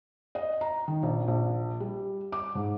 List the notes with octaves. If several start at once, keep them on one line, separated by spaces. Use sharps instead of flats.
D#5
A#5
D#3
A#1
A#1
G3
D6
G#2